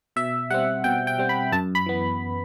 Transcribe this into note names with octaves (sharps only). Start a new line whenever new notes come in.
B2 E5
G3 C4 F#5
B2 G5
G5
G3 C4
B5
F#2 A5
B5
E3 B3